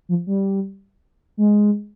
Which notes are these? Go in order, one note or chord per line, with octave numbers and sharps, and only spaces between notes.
F3
G3
G#3